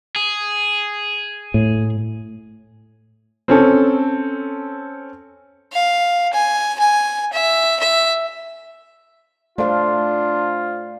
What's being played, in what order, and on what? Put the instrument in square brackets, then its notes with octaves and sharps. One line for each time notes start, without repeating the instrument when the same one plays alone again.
[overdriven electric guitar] G#4
[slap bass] A2
[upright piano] C4 C#4 A4
[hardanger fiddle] F5
G#5
G#5
E5
E5
[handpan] A3 A4 F5 [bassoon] D4 [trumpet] F4 [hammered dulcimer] C5